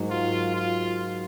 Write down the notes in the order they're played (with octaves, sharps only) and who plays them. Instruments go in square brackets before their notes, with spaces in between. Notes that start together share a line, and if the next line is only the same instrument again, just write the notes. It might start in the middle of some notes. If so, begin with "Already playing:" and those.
Already playing: [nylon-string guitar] G#2 F#3 A#3 D#4
[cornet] F4
F4